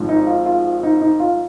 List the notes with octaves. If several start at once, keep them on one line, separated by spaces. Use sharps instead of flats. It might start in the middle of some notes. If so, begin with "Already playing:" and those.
Already playing: G#1 G#2 F3 C4
D#4
F4
F4
F4
D#4
D#4
F4